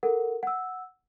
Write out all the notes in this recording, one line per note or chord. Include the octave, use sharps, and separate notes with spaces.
A4 A#4 F#5
F#5 E6